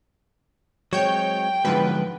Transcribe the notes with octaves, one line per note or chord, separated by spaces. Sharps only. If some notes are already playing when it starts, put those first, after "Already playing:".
F#3 G#3 C4 C#5 G5 G6
G#2 D3 F3 F#3 B3 B4